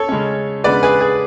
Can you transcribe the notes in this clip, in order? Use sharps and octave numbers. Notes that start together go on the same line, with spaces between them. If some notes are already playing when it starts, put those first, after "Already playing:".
Already playing: A4 C#5
C#3 G#3 C#4
C#3 G#3 B3 D4 B4 D5
G#4 B4
G#4